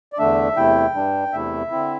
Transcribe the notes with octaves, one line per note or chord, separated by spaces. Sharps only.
D5
E2 D3 A3 D4 E5
E2 C3 A3 E4 G5
G2 G3 D4
E2 C3 A3 E4 E5
D3 C4 E4